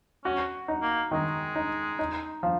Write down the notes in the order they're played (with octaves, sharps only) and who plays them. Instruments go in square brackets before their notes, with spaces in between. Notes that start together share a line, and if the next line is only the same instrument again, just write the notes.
[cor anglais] C#4 [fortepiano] F#4
[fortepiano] D#4
[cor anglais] A#3
[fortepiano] D#3 [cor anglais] G#3
[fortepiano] D#4
D#4
F3